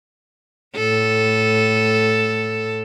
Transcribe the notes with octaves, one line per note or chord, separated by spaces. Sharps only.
A2 A4